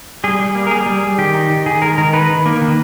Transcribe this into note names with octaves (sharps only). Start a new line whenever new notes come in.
G3 G#4
G3
A#3
A#4
G3 G#4
G3
G3
D#3 G4
D#4
D#3
D#3 G#4
G#3 A#4
D#3 A#4
D#4 B4
D#3
A#3
D#3